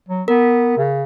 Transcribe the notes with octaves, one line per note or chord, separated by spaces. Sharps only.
F#3
B3 A#4
C#3